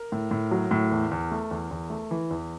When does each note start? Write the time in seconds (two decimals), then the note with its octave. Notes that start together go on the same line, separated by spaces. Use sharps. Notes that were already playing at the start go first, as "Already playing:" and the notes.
Already playing: A#4
0.12 A2
0.31 A2
0.51 F#3
0.71 A2
0.91 E2
1.11 E2
1.31 A3
1.51 E2
1.71 E2
1.90 A3
2.11 E3
2.31 E2